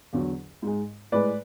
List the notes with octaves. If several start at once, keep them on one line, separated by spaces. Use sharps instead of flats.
E2 D3 F#3
G#2 G#3
A2 G#3 B4 D5